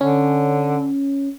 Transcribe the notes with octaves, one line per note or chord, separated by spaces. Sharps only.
D3 C#4